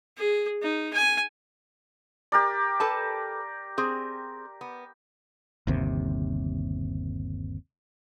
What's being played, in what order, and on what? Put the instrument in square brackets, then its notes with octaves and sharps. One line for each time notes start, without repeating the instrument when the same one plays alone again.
[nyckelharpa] G#4
D#4
G#5
[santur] G4 A#4 D5
[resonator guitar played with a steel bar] A4 B4 A5
C4 G#4
B3
[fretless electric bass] G1 D#2 C3